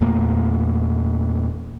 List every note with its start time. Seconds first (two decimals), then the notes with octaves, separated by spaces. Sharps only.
0.01 E2 A#2 A3 A#3